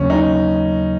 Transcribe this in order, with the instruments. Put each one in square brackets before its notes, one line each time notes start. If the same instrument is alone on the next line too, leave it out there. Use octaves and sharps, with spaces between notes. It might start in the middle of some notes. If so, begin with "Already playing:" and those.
Already playing: [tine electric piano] D#2 C#3 F#3 A#3 [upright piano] C#4
[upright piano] D#4